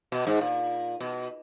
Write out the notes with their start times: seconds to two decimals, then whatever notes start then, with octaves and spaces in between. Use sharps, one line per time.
0.12 B2
0.27 G#2
0.41 A#2
1.00 B2